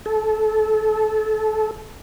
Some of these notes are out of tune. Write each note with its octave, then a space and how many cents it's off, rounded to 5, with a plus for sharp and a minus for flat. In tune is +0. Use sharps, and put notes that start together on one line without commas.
A4 -25